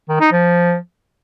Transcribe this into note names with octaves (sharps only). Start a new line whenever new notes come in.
D#3
D#4
F3